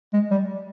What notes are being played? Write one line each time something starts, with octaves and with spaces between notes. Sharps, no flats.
G#3
G3